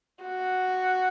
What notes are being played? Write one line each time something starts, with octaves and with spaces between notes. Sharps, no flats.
F#4